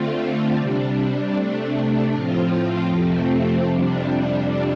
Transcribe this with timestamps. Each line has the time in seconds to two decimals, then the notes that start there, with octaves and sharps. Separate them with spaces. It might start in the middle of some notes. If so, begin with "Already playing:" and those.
Already playing: D3 A3 C4 F4
0.56 C3 G3 D4
1.34 C3 A3 D4
2.11 A2 F3 C4 F4
2.90 F2 C3 F3 A3 C4
3.68 F2 C3 G3 D4